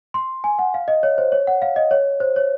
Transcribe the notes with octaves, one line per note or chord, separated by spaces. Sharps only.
C6
G#5
F#5
F5
D#5
C#5
C5
C#5
F#5
F5
D#5
C#5
C5
C#5